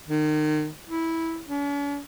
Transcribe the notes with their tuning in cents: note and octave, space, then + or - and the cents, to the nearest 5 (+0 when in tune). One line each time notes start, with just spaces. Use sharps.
D#3 -30
E4 -10
C#4 +45